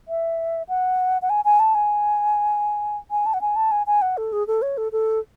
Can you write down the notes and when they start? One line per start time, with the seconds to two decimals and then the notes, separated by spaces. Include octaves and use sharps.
0.08 E5
0.69 F#5
1.22 F#5
1.30 G#5
1.45 G#5
1.59 A5
1.75 G#5
3.11 G#5
3.26 A5
3.34 F#5
3.41 G#5
3.56 A5
3.71 G#5
3.87 G#5
4.02 F#5
4.17 A4
4.32 G#4
4.47 A4
4.62 C#5
4.77 A4
4.92 A4